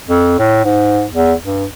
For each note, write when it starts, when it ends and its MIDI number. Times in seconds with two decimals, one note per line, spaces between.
0.08 0.35 41
0.39 0.62 45
0.64 1.04 44
1.13 1.33 40
1.45 1.65 43